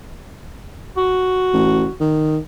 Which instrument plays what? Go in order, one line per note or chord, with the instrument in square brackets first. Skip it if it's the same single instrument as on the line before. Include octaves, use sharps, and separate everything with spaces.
[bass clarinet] F#4
[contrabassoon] A1
D#3